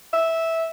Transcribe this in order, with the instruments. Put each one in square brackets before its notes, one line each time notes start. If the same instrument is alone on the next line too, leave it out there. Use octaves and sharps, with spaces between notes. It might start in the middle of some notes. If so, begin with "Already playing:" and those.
[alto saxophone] E5